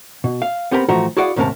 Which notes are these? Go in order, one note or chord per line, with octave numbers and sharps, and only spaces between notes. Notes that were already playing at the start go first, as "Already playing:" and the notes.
B2
F5
B3 C4 G4 A#4 G#5 B5
A2 E3 F3 A3 F#4 A#5
E4 F#4 G#4 D5 F5 F#5
D#2 G#2 C3 C#4 A#4 A5